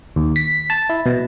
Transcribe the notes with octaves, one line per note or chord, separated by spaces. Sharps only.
D#2
B6
A5
E4
B2